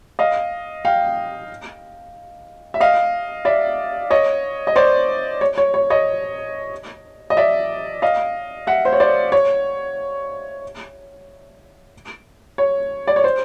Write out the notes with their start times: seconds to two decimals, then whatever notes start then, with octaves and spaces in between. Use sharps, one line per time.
0.19 D#5 F5
0.85 F5 G5
2.74 E5
2.80 D#5 F5
3.45 D5 E5
4.11 C#5 D#5
4.67 D#5
4.76 C5 D5
5.41 C#5
5.58 C#5
5.74 C#5
5.90 C#5 D#5
7.30 D#5
7.37 D5 E5
8.02 D#5 F5
8.67 E5 F#5
8.85 C5
8.93 C#5
9.00 C5 D5
9.32 C#5
12.58 C#5
13.07 D5
13.16 C#5
13.24 C5